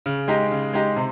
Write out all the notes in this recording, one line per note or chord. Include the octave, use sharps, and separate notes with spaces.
C#3
G#3 D#4 G4
C#3
G#3 D#4 G4
C3